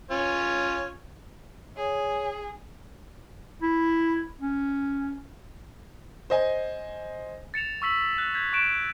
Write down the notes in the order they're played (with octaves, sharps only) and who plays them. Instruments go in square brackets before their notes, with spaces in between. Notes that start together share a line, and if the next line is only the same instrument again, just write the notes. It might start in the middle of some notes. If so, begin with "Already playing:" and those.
[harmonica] C#4 F4 C#5
[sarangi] G#4 [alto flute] C#5
[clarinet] E4
C#4
[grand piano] C5 D#5 G#5
[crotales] A6 C#7 E7 F7
C#6 E6 B6 F#7
F#6
G6 G#6 B6
C#6 F#6 D7 E7